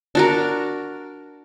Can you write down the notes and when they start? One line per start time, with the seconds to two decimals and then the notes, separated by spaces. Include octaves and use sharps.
0.15 D4 F#4 A#4